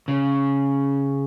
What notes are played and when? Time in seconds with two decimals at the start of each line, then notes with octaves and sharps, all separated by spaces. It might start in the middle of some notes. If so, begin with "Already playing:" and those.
0.08 C#3